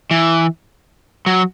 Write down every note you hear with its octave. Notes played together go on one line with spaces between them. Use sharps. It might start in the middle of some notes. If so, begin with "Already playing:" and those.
E3
F#3